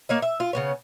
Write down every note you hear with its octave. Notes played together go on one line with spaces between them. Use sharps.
A#3 C#5 D#5
E5
F4
C#3 B3 C#5